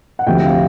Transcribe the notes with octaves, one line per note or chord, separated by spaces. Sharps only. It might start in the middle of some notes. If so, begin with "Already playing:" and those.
F#5
D2 C3 F3 G5
F5